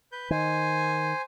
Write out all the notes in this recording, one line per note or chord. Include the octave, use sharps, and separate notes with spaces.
B4 G6
D#3 C5 G#5